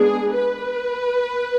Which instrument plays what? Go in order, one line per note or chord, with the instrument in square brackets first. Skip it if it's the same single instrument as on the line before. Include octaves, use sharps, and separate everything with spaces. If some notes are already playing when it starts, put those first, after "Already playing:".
Already playing: [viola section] G#3 B3 D4 G#4
B4